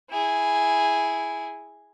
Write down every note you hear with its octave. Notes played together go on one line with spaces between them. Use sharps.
E4 G#4